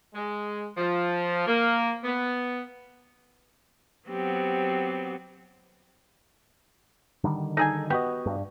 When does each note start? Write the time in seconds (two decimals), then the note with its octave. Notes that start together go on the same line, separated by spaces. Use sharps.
0.14 G#3
0.78 F3
1.47 A#3
2.04 B3
4.09 F#3 B3 C4 G4
7.24 D3 D#3 G3
7.57 D#4 G#4 A4 G#5
7.90 B3 F#4 G4 D#5
8.26 G2